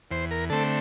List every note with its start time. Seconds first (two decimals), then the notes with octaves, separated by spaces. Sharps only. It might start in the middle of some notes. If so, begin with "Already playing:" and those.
0.11 E2 C5
0.31 A#4
0.50 D3 A3 C4 A4